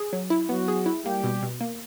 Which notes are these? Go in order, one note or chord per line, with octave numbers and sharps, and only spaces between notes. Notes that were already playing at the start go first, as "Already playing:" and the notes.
Already playing: G#4
F#3
E4
F#3 B3 F#4
G#4
E4
G3 A#3 G4
B2
B2
A#3